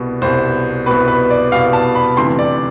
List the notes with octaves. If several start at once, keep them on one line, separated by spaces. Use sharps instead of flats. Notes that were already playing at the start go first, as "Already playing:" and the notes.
Already playing: C2 B2
C2 B2 C5
C2 B2 B4
B4
D5
C2 B2 F5
A5
B5
D2 C3 E3 C6
D5